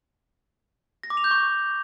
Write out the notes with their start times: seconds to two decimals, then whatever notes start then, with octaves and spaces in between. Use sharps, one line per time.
1.03 A#6
1.10 D6
1.17 F7
1.24 G6
1.31 C#6